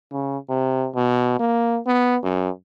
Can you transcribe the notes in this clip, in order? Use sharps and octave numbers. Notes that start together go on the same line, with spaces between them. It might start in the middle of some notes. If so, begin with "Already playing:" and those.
C#3
C3
B2
A#3
B3
F#2